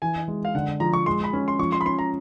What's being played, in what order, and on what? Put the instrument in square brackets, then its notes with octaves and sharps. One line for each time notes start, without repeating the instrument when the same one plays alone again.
[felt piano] E3 [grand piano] G#5
[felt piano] G#3
[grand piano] F5
[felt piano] D3 [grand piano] F#5
[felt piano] F3 [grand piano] A#5
[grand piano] C#6
[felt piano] G#3 [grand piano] C6
[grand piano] B5
[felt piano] C#4
[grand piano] C6
[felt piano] F3 [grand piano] C#6
[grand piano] C6
B5
[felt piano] C#4 [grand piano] C6
[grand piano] A#5